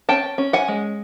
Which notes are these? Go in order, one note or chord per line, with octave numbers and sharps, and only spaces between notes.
C#4 G5 A5
C#4
F#5 G#5
G#3